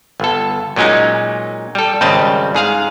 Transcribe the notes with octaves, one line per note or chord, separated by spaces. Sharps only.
G1 A4
A#2 F#3 G#3 C#4 D#4
G3 A4
G#1 C#3 G3 C4 D#5 A5
G#2 G#4 F5